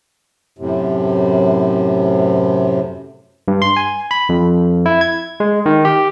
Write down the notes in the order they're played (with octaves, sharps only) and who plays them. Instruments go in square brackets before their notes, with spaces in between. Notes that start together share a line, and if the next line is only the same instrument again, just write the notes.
[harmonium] F#2 A2 C3
[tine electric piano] G2
C6
G#5
B5
F2
E4
G#6
G#3
D#3
G4